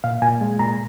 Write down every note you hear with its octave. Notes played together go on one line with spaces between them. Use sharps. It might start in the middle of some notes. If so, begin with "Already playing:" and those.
A#2 F5
A#2 G#5
G#3
A#2 A#5